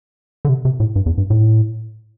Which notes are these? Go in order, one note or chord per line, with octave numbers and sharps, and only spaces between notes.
D3
C3
C3
A2
G2
E2
G2
A2